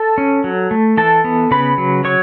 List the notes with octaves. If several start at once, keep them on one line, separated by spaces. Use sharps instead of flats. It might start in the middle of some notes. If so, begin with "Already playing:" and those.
Already playing: A4 A5
C#4
F#3
A3
E3 A4 A5
B3
C#3 B4 B5
F#3
F#3 C#5 C#6